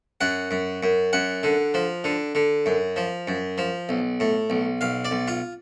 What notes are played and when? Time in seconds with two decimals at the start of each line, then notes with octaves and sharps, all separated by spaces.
0.21 F#2 F#5
0.51 F#2
0.83 F#2
1.13 F#2 F#5
1.43 D3
1.74 F3
2.04 D3
2.35 D3
2.66 F#2
2.96 F3
3.28 F#2
3.58 F3
3.89 B1
4.20 A2
4.50 B1
4.81 B1 F5
5.05 D5
5.11 B1
5.28 F4